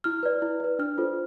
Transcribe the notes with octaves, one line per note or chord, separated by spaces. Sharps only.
E4 F6
B4 D5
E4
B4 D5
D4 F6
F4 A4 C5